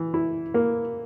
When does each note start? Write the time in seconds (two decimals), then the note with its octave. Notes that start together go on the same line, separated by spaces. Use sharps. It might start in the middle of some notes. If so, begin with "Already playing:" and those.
Already playing: E3
0.14 E4
0.54 A#3